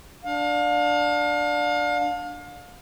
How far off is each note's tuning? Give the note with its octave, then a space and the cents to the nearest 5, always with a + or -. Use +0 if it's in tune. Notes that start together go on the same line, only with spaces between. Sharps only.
D4 +5 F5 +35